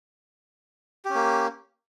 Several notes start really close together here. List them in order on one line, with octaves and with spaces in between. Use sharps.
G4 C#4 A#3